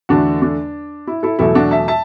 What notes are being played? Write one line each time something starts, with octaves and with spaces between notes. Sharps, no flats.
E2 D3 A3 D4 F#4
D4
E4
E4 A4
E2 B2 F#3 A3 E4 A4
D4 F#4
E5 A5
E5 A5